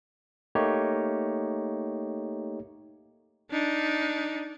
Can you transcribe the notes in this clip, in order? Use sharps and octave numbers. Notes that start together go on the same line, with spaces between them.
A3 A#3 D#4 G4 C#5
D4 D#4